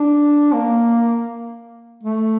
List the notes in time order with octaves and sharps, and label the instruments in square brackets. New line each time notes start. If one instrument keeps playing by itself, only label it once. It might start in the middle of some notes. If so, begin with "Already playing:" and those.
Already playing: [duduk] D4
A#3
A3